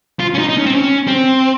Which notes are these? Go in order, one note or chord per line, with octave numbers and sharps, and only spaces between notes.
F4
C#4
D#4
D#4
C#4
C4
C#4
C4